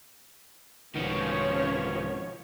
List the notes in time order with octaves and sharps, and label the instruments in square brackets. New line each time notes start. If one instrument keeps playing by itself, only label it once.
[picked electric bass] C2 G#2 B2 [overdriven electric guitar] D#3 B3 [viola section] F3 C#4 C#5